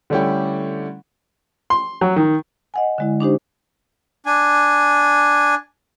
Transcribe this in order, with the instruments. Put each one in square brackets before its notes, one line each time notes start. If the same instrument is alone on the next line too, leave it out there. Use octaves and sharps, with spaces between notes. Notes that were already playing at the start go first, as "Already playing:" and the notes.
[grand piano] D3 G3 A3 C#4 E4 G4
[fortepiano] C6
F#3
D#3
[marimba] D#5 F#5 G#5
D3 G#3 E4
D4 D#4 G4 C5
[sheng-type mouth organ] D4 G#5